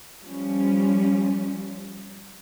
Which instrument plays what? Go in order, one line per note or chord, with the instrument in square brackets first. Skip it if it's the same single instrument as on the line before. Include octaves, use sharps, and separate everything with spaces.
[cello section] F3 G3 C#4